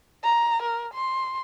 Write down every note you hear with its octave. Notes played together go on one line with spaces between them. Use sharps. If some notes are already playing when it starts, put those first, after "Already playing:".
A#5
A#4
C6